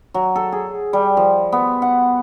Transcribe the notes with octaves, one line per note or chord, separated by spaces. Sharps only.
F#3
A4
G#4
G3
F3
B3
F#5